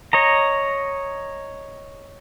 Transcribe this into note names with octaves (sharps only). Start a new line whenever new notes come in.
C#5 D#5 A#5